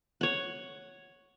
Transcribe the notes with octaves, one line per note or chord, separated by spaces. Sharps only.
C#5 F#5